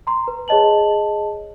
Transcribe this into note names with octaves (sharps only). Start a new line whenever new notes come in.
A#5 C6
B4
G#4 C#5 D#5 A5 F#7